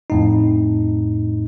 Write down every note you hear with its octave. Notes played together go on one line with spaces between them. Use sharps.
F2 A2 D#4